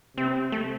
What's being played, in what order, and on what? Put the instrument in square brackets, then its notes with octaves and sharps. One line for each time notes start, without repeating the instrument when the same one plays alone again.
[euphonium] C3 [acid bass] C4
[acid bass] A3